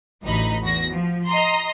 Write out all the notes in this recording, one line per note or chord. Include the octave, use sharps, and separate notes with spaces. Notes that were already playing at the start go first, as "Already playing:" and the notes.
A1 D2 D#4 B5
E2 F#4 A#6
F3
D#5 A#5 C6